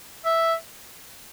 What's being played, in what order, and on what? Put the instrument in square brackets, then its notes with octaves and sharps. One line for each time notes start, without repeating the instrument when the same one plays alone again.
[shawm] E5